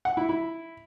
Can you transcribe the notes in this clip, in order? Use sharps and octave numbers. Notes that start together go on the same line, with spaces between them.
F#5
E4
E4